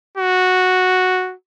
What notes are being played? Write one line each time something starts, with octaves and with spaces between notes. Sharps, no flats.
F#4